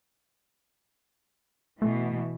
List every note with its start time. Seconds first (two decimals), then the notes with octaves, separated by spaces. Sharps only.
1.82 B2 E3 A3